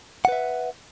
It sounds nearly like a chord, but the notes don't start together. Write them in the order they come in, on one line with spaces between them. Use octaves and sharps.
F#5 B4 E5